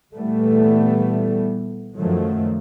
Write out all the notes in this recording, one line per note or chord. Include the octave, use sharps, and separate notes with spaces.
A#2 E3 G3 A3 B3
F#2 D#3 F3 F#3 A3